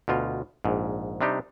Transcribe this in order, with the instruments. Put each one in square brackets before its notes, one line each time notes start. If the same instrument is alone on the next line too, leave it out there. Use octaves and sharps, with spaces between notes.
[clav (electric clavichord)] D2 B2 F4
A#1 G#2
C3 G3 D4 D#4 G4